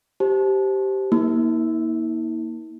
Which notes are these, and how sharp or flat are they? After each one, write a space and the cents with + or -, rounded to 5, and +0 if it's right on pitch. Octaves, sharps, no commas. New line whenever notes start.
G4 -10 C5 +0 A5 -30
A#3 +20 E4 -45